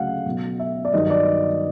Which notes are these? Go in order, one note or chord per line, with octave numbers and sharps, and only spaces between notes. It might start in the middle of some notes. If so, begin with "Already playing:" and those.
Already playing: D2 C#3 F#3 A3 F5 F#5
B1 B2 F#3
E5
D5
G2 D#3 F#3 B3 D#5
D5